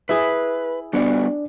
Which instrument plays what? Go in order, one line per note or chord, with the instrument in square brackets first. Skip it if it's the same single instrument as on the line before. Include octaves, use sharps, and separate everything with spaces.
[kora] E4 G#4 [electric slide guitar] B4
[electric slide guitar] G3 B3 F#4 [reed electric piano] D4 D5